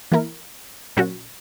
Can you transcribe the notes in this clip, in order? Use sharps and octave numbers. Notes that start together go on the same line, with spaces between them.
E3 A#3 E4 A#4
A#2 F#3 C#4 F#4